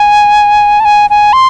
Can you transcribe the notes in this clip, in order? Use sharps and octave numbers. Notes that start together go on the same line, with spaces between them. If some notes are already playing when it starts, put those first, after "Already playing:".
Already playing: G#5
A5
G#5
G#5
C6